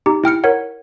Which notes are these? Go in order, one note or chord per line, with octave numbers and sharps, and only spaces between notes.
D#4 G4
E4 G5 F6 C#7
A#4 C#5 F#5